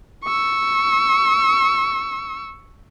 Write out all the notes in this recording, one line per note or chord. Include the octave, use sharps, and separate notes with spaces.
C#6 E6